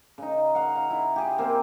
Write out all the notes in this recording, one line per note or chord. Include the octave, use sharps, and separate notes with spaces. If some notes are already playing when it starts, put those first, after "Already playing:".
C#3 D#4
F5 F#5
A#5
E4
G4 G#4
A#3 C4